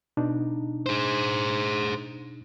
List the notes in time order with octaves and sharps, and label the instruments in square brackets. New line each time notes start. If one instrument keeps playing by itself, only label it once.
[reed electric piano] B2 D4 D#4
[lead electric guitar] G#4 C5